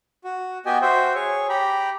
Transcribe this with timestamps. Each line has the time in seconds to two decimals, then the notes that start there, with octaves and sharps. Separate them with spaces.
0.24 F#4
0.66 B3 F#4 G4 D#5 G5 G#5
0.81 F#4 C5 E5 G5
1.15 G#4 C#5 C#6
1.49 G4 G5 A#5 B5